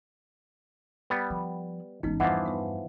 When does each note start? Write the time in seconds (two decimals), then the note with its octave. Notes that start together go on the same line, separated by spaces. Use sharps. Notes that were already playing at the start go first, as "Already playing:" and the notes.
1.10 G3 B3
1.30 F3
2.03 G#1 G#2 E3 B3 C#4 D#4
2.20 E2 G2 E3 F3 D#5 F#5 D6
2.46 B3 B4